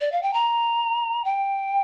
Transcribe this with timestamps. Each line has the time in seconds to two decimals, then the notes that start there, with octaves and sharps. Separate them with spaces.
0.01 D5
0.12 F5
0.23 G5
0.34 A#5
1.25 G5